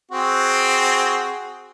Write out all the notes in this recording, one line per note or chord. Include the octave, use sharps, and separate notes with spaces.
C4 F#4 G#4